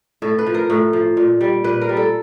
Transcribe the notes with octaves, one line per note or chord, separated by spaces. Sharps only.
A2 A4
B4
F3
A#4
A2
F3
A#2
G3
A#2 B4
A#4
G3
A4